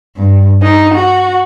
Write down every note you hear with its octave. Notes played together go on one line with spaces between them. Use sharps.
G2
D#4
F#4